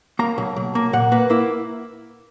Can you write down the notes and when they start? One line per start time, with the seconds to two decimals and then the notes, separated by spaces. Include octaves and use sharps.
0.19 A#3 A#5
0.38 B1
0.56 B1
0.75 A#3
0.93 A#2 F#5
1.12 A#3 B4
1.30 A#3 E4